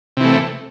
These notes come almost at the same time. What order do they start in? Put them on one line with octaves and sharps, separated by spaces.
C3 E3 A3